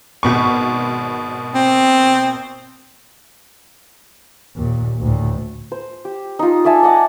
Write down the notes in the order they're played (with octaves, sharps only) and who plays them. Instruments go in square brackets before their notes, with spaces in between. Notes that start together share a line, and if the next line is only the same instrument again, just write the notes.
[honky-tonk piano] G#1 B2 C#6
[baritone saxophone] C4
[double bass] D#2 A#2
D2 A2
[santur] C5
G4
D#4 F4
D5 E5 G#5 A5
D5 D#5 F#5 D6